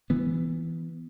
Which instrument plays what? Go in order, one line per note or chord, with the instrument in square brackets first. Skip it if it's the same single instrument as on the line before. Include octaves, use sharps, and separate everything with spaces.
[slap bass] E3 B3